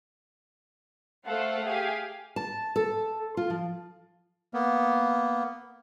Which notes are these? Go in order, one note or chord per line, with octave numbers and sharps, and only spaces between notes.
A3 A4 C5 F5 F#5
G4 G#4 F5 G#5
A5
A4
F4
F3
A#3 B3